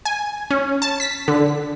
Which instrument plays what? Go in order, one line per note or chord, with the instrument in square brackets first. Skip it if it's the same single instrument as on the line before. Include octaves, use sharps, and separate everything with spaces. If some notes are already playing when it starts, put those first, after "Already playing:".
[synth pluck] G#5
C#4
A5
B6
D3